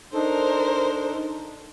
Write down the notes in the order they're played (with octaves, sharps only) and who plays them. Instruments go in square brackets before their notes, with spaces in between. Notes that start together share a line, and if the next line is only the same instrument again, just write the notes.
[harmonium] D4 D#4 A4 [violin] A#4 C5